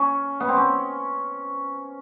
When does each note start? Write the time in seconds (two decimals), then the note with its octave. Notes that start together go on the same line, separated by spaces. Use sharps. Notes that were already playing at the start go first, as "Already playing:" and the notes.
Already playing: C#4
0.40 B3
0.48 C4
0.57 C#4